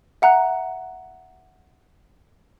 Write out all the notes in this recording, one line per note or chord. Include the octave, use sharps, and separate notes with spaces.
E5 F#5 A#5 F#6